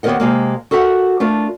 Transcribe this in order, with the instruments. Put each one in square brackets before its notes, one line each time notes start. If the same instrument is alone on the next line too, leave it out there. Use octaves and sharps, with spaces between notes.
[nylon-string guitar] D#2 B3 A#4 D#5 F#5
C3 G#3 A#3
F#4 A4 A#4 E5 F#5
A3 D4 F4 A#4